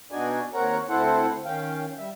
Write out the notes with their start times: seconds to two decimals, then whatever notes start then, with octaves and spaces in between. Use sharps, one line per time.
0.11 B2 D4 D#4 F#4 D5 G#5
0.54 D#2 C4 A#4 C#5 F#5 A#5
0.89 D2 C4 E4 A4 C5 F#5
1.45 D#3 C#4 F5 G5
1.98 G3 E5